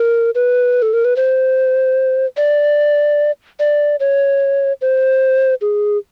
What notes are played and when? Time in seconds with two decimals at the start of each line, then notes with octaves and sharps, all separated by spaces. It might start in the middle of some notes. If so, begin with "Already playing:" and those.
Already playing: A#4
0.35 B4
0.82 A4
0.93 A#4
1.05 B4
1.16 C5
2.37 D5
3.59 D5
4.00 C#5
4.81 C5
5.61 G#4